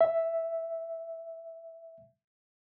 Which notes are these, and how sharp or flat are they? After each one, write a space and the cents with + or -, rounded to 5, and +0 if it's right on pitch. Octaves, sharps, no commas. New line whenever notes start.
E5 +0